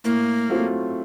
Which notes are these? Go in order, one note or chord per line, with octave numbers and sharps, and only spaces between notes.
A2 A#3
F#3 A3 C4 F4